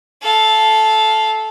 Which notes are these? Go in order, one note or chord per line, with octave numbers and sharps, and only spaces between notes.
A4 F5